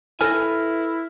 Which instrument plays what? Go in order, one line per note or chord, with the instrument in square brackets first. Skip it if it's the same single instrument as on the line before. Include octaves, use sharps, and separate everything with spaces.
[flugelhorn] E4 [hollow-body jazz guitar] A4 B4 G#5 [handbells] F6 A#6